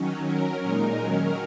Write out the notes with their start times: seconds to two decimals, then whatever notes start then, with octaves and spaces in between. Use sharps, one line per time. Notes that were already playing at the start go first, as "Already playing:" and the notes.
Already playing: D#3 F#3 C#4
0.27 F#3 C#4 A#4
0.63 A#2 G#3 D#4
0.98 D#3 F#3 C#4 A#4